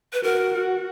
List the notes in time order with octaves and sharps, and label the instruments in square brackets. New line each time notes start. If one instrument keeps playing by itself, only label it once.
[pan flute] B4
[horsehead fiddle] F#4 [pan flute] A#4
[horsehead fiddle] F#4